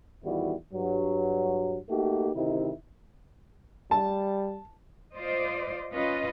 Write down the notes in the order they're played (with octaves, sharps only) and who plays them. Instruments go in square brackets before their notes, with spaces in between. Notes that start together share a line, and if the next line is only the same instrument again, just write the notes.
[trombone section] A1 E2 D#3 G3 E4 F#4
G2 F#3
A3 A#3 D#4 F#4 G4
D2 C3 D#3 D#4 E4
[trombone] G3 [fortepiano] A5
[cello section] F4 C5 D5 D#5
C#4 F4 B4 D#5